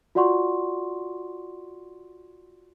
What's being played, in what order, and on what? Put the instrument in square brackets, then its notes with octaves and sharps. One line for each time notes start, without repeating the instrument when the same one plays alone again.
[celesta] F4 F#4 D5 F#5 C6 C#6